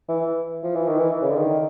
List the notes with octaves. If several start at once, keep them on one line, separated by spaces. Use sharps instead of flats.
E3
F3
E3
D#3
E3
C#3
D3
D#3